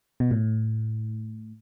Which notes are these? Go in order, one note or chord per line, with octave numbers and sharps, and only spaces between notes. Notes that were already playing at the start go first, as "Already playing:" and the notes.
B2
A2